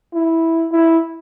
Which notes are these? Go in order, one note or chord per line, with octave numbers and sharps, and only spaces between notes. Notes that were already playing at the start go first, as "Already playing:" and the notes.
E4
E4